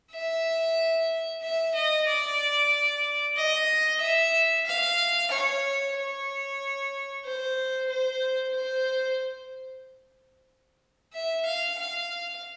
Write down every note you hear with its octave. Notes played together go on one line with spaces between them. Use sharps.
E5
E5
D#5
D5
D#5
E5
F5
C#5
C#5
C5
C5
C5
E5
F5
F5